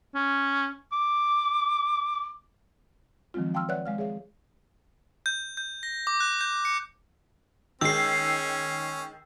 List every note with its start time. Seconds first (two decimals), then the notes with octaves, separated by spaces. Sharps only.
0.15 C#4
0.93 D6
3.34 D#3 F3 F#3 G#3 C4 F4
3.54 F5 G5 A5 C6 E6 F6
3.69 B4 C#5 D5 E5 F#5 F#6
3.86 G#3 F5 F6
3.98 G#4 C#5 E5 F5
5.26 G6
5.57 G6
5.83 A#6
6.07 D6
6.20 F#6
6.41 G6
6.65 C#7
7.81 D#3 G#3 C#4 E6 C7